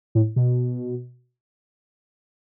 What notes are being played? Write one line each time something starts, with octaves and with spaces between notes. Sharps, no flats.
A2
B2